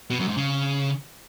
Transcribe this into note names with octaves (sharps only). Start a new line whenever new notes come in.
B2
F#2
G#2
C#3